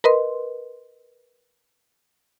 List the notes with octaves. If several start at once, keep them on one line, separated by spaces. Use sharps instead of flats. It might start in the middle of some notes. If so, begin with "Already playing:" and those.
A#4 B4 D#5 C6